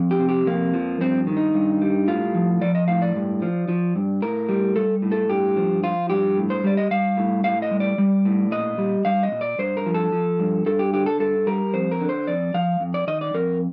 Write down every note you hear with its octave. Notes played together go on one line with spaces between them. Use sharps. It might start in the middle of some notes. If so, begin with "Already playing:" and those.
Already playing: F2
G4
C3
G4
F2 A#3
F3
G2 C4
D#3
D#4
G2
G3
A2 F4
F3
F3 D5
D#5
A2 F5
D5
G2
F3
F3
G2
A2 A#4
G3
G3 A4
A2
A4
G2 G4
F3
F3 F4
G2 G4
A2
C5
G3 D5
D#5
G3 F5
A2
A2 F5
D#5
G3
D5
G3
A2
A#2 D#5
G3
G3 F5
D#5
A#2
D5
G2 C5
A#4
F3
A4
F3
G2
G2 A4
G4
D3 G4
A4
G2 A4
G3 A#4
F2 C5
A#4
D3
C5
F2 D5
F3 F5
F2
D5
D#3 D#5
D5
F2 A#4